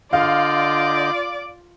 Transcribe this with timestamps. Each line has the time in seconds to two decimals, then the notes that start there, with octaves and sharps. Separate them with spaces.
0.13 D3 F4 D5 D#5 F5 G6